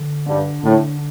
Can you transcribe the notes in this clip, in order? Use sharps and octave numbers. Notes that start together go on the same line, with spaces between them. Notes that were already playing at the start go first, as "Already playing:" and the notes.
Already playing: D3
G2 D4
A2 D3